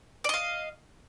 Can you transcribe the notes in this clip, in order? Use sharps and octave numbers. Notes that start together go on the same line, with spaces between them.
D5 D#5 F5